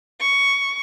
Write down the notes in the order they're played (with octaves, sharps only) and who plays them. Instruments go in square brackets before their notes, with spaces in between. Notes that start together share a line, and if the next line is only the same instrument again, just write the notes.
[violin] C#6